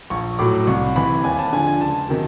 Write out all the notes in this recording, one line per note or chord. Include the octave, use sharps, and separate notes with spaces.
A#1 C#6
A2 F#3 D6
C2 C#6
C3 E3 B5
D#2 G#5
A5
D3 F3 G#5
G#5
C#2 A5
C3 D#3 F#3